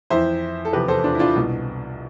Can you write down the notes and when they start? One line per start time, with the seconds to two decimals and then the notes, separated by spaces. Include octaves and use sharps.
0.10 F2 E3 C5 E5
0.65 A4
0.73 E2 C3 F3 G4 B4
0.88 A4 C5
1.04 D4 F4
1.15 E4
1.19 D4 F4
1.36 C2 B2